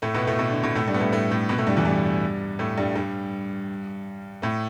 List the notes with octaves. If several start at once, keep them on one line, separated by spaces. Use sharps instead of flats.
A2 A3
B2 B3
A2 A3
B2
D3
B2
A2 A3
G2 G3
B3
A2 A3
A2 A3
A2 A3
B2 B3
A2 A3
G2 G3
E2 E3
G2 G3
A2 A3
G2 G3
G2 G3
A2 A3